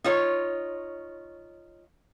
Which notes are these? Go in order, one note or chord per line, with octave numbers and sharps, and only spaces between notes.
D#4 F4 C#5